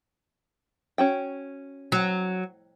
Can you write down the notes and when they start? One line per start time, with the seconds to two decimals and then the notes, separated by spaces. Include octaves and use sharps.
0.98 C#4 F#4 G5
1.92 F#3